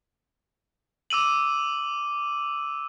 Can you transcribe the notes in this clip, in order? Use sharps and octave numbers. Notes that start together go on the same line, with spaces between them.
D6 E6 D#7 F#7